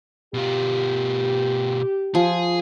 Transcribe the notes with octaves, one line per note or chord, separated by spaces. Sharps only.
B2 F4 G4
F3 G#4 G#5